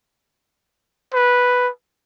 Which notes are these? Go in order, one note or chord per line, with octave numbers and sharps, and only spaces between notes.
B4